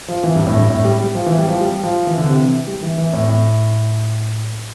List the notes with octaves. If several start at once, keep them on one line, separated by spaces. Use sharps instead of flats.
F3
E3
G2
A2
G2
A2
G3
G3
F3
E3
G3
F3
G3
F3
E3
D3
C3
E3
G3
E3
E3
A2
A2